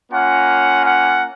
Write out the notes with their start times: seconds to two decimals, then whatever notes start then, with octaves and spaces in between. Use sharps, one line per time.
0.12 A#3 C#4 F4 F#5
0.85 F#5